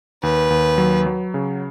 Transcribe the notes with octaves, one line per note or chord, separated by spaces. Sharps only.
D#2 B4
D#2
F#3
F#3
C#3